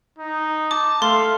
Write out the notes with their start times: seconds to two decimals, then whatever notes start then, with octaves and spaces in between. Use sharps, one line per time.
0.19 D#4
0.71 A5 D6
1.02 A3 F5 C6